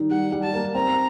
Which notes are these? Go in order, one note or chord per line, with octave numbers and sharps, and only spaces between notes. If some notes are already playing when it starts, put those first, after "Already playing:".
Already playing: D#3 G3 D#4
G3 F#5
G3
A5
A#3
C4 A#5